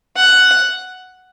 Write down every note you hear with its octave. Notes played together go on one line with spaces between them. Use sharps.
F#5